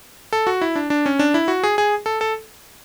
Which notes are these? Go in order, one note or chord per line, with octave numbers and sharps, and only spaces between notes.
A4
F#4
E4
D4
D4
C#4
D4
E4
F#4
G#4
G#4
A4
A4